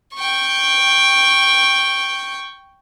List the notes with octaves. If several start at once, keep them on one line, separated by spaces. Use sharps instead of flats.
G5 C#6